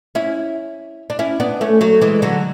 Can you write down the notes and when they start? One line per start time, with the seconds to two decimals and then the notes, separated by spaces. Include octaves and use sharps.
0.15 C#4 E4
1.10 D4
1.19 C#4 E4
1.40 B3 D4
1.61 A3 C#4
1.81 F#3 A3
2.01 E3 G#3
2.22 D3 F#3